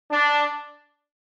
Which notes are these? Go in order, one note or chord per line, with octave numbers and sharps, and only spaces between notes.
D4